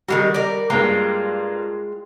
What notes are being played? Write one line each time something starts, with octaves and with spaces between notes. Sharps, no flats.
D#3 G3 G#3 F#4
A#4 D5
G2 G#3 A#3 F4 G5 A#5